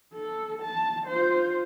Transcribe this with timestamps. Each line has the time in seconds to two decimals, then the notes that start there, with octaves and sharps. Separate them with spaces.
0.14 A4
0.62 A5
1.07 F4 C5